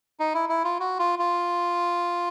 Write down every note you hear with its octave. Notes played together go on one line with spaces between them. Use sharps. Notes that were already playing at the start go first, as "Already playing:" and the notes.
D#4
E4
E4
F4
F#4
F4
F4